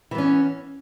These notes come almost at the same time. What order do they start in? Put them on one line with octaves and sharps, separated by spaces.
E3 B3 C#4